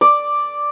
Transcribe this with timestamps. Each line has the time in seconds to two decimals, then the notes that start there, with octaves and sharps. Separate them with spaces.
0.01 D5